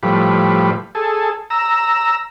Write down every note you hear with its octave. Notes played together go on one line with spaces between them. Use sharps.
A2 F3 G3 B4
G#4 A4
A#5 E6